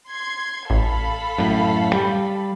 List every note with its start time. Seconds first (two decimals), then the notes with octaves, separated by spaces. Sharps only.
0.10 C6 G#6
0.70 A1 A4 F5 B5
1.38 F#2 A2
1.93 G3